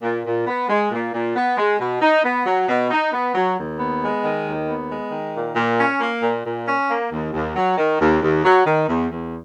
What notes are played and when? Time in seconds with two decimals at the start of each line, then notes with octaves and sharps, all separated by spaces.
0.02 A#2
0.25 A#2
0.47 B3
0.69 G#3
0.91 A#2
1.14 A#2
1.36 B3
1.58 G#3
1.80 B2
2.02 D#4
2.24 B3
2.46 F#3
2.68 B2
2.91 D#4
3.13 B3
3.35 F#3
3.57 D#2
3.79 B3
4.01 G#3
4.24 D#3
4.46 D#2
4.68 B3
4.90 G#3
5.12 D#3
5.34 A#2
5.56 A#2
5.79 C#4
6.01 A#3
6.23 A#2
6.45 A#2
6.67 C#4
6.89 A#3
7.12 D#2
7.33 D#2
7.56 F#3
7.78 D#3
8.00 D#2
8.22 D#2
8.44 F#3
8.66 D#3
8.89 E2
9.11 E2